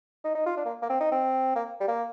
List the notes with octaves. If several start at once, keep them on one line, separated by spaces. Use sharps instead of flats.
D#4
D#4
F4
D4
A#3
A#3
C4
D#4
C4
A#3
G3
A#3